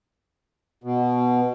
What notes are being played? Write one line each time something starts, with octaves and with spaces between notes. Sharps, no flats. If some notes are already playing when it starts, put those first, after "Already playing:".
B2